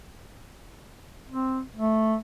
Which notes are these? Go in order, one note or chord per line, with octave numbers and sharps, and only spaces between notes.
C4
A3